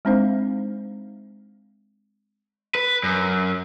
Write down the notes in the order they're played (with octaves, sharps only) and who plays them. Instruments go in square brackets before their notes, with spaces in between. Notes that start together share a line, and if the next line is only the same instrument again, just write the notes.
[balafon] G#3 C4 D4 D#4 C5 F5
[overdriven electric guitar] B4
F#2